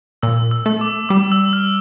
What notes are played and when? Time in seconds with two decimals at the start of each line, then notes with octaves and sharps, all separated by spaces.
0.23 A#2 E6
0.51 E6
0.66 A3
0.81 D6
1.09 G3 D6
1.32 E6
1.53 F6